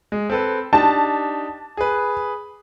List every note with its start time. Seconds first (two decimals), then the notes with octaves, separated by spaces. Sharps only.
0.12 G#3
0.30 C4 A4 B4
0.73 D4 D#4 G4 A5
1.77 G#4 B4